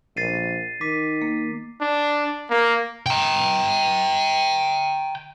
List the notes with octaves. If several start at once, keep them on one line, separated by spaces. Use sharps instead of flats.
A#1 A6 C7 D#7
D#3 D6 B6 D#7
A#3
D4
A#3
G5 A#5